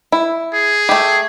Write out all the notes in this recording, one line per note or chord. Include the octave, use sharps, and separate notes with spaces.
E4
G#4
A3 G4